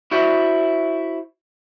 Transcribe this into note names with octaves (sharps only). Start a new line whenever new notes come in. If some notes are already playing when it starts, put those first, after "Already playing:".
E4 F#4 C5 D5 E5